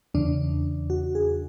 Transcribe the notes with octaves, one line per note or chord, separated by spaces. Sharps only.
E2 C#3 E3 D4
F#4
G#4